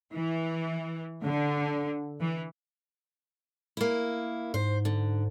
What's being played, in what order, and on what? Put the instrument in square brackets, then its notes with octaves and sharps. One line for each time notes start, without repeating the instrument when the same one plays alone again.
[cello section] E3
D3
E3
[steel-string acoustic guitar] A#3 E4
[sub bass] G#2 [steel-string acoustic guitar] C5
[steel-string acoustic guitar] D3